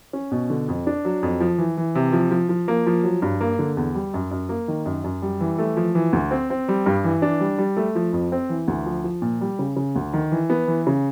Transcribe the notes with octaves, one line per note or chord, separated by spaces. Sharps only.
C#4
B2
D3
F2
D4
F#3
F2
F3
E3
E3
C3
F3
F3
F3
A#3
F3
F#3
G2
A#3
D3
E2
G3
F#2
F#2
A#3
D#3
F#2
F#2
G3
E3
A3
F3
E3
D2
C4
C4
G3
G2
E3
D4
G3
G3
A3
F3
F2
C4
E3
D2
F3
F3
A#2
G3
C#3
C#3
D2
D#3
E3
B3
E3
C#3